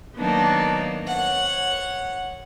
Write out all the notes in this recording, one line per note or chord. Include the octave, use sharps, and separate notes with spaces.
D#3 F#3 A#3 B3 D4 D#4
C#5 F#5